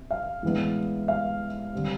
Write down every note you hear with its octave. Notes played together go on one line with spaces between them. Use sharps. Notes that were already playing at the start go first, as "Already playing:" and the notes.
Already playing: C3
F5
A2 E3 G#3 B3 D4
F5
D3 G3 C4